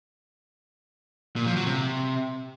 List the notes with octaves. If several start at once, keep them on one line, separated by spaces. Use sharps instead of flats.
A#2
F3
F#3
C3